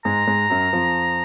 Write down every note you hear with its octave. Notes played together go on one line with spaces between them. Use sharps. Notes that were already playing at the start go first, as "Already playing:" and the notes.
G#2 G#3 A#5
G#2 G#3
F#2 F#3
F2 F3